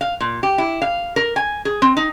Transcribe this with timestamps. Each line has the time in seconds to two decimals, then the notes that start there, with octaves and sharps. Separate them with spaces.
0.01 F5
0.20 A#2
0.43 G4
0.58 E4
0.82 F5
1.16 A#4
1.36 G#5
1.65 G#4
1.82 C4
1.97 D#4